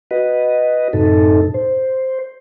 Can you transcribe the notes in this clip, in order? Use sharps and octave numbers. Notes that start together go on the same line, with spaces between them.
F#4 B4 D#5
F#2 A2 C3 D#4 A4
C5